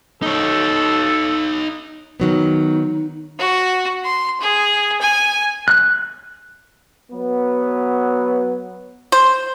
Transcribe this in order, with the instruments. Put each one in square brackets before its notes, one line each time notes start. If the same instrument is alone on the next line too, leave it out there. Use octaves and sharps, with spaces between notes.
[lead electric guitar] D#4 C#5 [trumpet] A4
[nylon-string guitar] D#3 F#3 B3 [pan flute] D#4
[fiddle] F#4
C6
G#4
G#5
[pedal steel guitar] F#6
[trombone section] F#3 B3
[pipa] C5